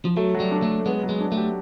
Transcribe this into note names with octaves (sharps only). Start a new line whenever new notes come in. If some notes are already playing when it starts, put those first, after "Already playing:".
F3
F#3 A3
F#3
G3
D4
A3
F#3
G#3 B3
F#3
G#3
D4
A3
G4